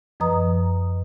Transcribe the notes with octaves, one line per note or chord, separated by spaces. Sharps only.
F#2 F3 B4 D#5 A#5 D#6